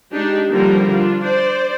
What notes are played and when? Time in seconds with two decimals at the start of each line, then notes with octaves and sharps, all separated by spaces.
0.12 G#3 D4 D#4 G4
0.50 D3 F3 G3 A#3 F4 A#4
0.89 D4 F4
1.22 C5 D5